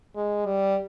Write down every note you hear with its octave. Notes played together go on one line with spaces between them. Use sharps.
G#3
G3